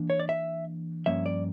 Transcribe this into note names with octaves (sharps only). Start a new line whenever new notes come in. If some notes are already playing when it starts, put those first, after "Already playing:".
Already playing: E3 A#3 D4
C#5
D5
E5
G2 F3 A#3 C#4 E5
D5